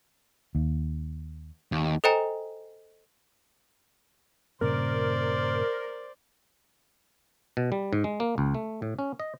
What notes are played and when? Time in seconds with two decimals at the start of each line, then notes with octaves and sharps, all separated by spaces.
0.55 D#2
1.72 D#2
2.04 A4 C5 D#5 G5 G#5 A#5
4.61 G2 A#2 C#3 A#4 C5 D5
7.57 B2
7.72 G3
7.93 G#2
8.04 G#3
8.20 A#3
8.38 C#2
8.55 A3
8.82 A2
8.99 C#4
9.20 D#5